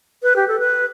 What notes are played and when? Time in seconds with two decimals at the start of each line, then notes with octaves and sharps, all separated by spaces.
0.23 B4
0.36 G4
0.48 A4
0.60 B4